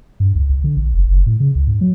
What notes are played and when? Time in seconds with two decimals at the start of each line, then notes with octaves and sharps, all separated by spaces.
0.20 G2
0.35 C#2
0.49 C2
0.64 D3
0.77 A#1
0.95 F#1
1.07 F#1
1.26 A2
1.40 C#3
1.55 C#2
1.67 G#2
1.81 F#3